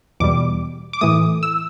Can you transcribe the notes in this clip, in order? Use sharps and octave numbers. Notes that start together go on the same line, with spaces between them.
E2 B2 G3 D6
D6
A2 E3 A3 D#6
E6